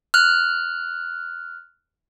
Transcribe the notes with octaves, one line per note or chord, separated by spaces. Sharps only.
F6 F#6